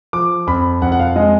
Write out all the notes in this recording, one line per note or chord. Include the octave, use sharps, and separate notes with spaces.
F3 D6
F2 B5
F2 F#5
F#5
F5
G#3 D#5